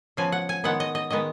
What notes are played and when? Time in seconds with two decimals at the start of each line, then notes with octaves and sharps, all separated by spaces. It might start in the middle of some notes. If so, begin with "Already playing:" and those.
0.17 C#3 F3 B3 G#5
0.32 F#5
0.49 G#5
0.64 D#3 G#3 B3 F#5
0.80 D#5
0.95 D#5
1.10 D#3 G#3 B3 D#5